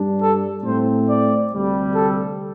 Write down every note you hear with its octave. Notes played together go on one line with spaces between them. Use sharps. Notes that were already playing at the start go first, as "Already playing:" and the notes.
Already playing: G2 G3 D4
A4
A2 A3 C4 C5
D5
D2 C3 G3
A4